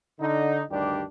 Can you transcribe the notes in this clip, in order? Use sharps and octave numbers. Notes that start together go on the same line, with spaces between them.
D3 D#4
D2 G2 D#3 G3 D4 G4